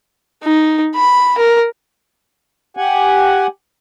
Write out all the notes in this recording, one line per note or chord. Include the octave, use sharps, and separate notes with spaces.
D#4
B5
A#4
G4 F#5 G#5